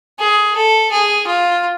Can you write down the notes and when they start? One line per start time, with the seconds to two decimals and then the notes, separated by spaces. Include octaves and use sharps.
0.20 G#4
0.56 A4
0.92 G#4
1.27 F4